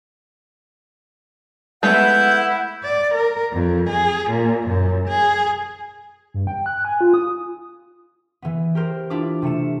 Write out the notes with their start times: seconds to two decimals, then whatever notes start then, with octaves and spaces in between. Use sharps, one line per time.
1.83 G#3 A3 B3 E4 F#5 G6
2.84 D5
3.15 A#4
3.53 F2
3.90 G#4
4.31 A#2
4.67 F#2
5.08 G#4
6.34 G2
6.47 G5
6.66 F#6
6.85 G#5
7.01 F4
7.14 D#6
8.42 E3 B3
8.75 G4 A#4 C5
9.10 D4 E4 F4 D6
9.42 C3 A3 C#7 E7